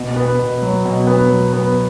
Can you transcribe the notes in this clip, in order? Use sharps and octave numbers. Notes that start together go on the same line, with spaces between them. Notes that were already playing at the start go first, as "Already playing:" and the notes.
Already playing: B2
B3
B2
F#3
B2
B3
F#3
B3